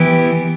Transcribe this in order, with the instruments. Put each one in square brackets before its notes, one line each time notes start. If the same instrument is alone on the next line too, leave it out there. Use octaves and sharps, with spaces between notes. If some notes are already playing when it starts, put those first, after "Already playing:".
Already playing: [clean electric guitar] E3 B3 E4 G4